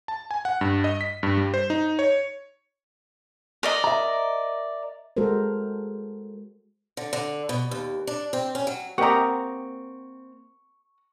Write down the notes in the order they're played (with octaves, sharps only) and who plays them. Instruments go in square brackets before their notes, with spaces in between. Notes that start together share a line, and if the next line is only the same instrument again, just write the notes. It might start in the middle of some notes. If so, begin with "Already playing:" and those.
[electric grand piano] A5
G#5
F#5
G2
D#5
B6
G2
G3
C5
D#4
C#5
[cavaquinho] A#4 D5 D#5
[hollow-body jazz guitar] E5 A#5
[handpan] G#3 F#4 A4 A#4 C5
[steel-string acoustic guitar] D3
D3
B2
D#2
D4
C4
C#4
F#3
[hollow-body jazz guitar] A#3 C4 [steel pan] G4 A#4 D#5 [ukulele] F#5 A#5 [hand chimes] C#6